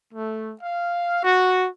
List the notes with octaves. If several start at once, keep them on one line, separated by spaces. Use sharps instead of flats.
A3
F5
F#4